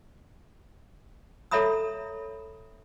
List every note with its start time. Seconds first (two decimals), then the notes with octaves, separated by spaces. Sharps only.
1.51 A4 C#5 E5 A#5 B5 D#6